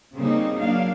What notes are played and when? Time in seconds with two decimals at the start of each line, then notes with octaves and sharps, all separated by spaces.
0.17 C#3 G3 A#3 C4 D#4
0.58 F#3 A#3 D4 F5